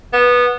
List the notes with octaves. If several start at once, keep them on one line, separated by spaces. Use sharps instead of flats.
B3